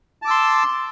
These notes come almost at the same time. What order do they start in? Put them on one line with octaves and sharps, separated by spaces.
A5 D6 E6 C6